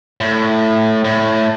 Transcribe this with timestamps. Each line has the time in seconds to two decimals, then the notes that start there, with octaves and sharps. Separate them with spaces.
0.20 A2
1.05 A2